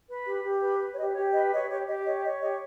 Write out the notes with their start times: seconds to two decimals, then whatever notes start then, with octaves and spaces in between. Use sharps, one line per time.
0.09 B4
0.25 G4
0.44 G4
0.62 B4
0.80 B4
0.93 C#5
0.98 G4 D#5
1.15 G4 C#5
1.33 B4 D#5
1.51 C#5 D#5
1.69 G4 C#5
1.87 G4 D#5
2.05 C#5 D#5
2.23 C#5 D#5
2.41 G4 D#5